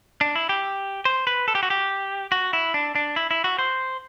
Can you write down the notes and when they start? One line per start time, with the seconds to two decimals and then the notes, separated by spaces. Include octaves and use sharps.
0.21 D4
0.36 E4
0.49 G4
1.05 C5
1.27 B4
1.48 A4
1.55 G4
1.63 F#4
1.70 G4
2.32 F#4
2.53 E4
2.74 D4
2.95 D4
3.16 E4
3.31 E4
3.44 F#4
3.59 C5